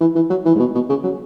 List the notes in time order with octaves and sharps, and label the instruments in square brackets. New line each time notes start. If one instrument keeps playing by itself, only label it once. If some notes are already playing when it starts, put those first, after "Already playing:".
[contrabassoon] E3
E3
F#3
E3
G#2
B2
B2
C#3
F#3